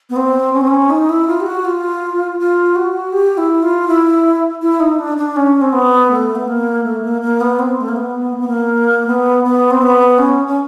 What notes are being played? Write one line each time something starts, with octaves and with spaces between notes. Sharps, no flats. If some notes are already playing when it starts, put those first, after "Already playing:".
B3
C4
C#4
C4
C#4
D#4
E4
F4
G4
F#4
F4
F4
F#4
G4
E4
F4
E4
E4
D#4
D4
D4
C#4
C4
B3
A3
B3
A#3
A3
A#3
A#3
B3
C4
A3
A#3
B3
A#3
B3
A#3
B3
B3
C4
B3
C#4
C#4